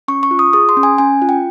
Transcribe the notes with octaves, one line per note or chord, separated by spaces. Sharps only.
C#4 C#6
C#6
F4
D#6
G#4 D#6
C6
C#4
G#5
C#4 G#5
F4
G5